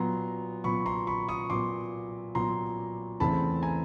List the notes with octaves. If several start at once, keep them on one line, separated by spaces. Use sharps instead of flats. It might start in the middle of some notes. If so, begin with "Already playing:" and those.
Already playing: A#2 F#3 B3 A#5 C6
A#2 F#3 B3 B5 C#6
A#5 C6
B5 C#6
C#6 D#6
A#2 F#3 B3 C6 D6
A#2 F#3 B3 A#5 C6
E2 C#3 E3 A3 C4 A5 B5
G#5 A#5